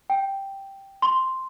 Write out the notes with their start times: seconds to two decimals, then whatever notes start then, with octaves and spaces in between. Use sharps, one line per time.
0.10 G5
1.02 C6